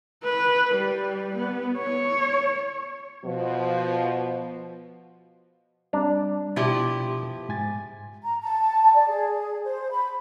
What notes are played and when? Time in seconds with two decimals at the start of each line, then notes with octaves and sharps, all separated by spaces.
0.25 B4
0.76 G3
1.36 B3
1.78 C#5
3.25 B2 F3
5.93 G3 C4 D4 A#5
6.56 B2 F3 E4 G4
7.49 G#2 G#5 A6
8.23 A#5
8.42 A5
8.94 D5
9.08 G#4
9.64 C5
9.91 B5